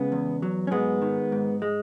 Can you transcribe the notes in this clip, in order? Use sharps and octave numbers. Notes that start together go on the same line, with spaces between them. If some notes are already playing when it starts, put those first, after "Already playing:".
Already playing: C#3 G#3 B3
E2
F#3
C#4
G#2 G#3 B3
D#3
G#2
G#3